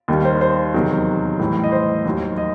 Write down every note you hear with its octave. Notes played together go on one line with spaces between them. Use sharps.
D#2 D#3 G3
C5
C5
E2 C3 D#3 F#3
A2 E3 G3
D#5
C5
D#2 D#3 F#3
D#5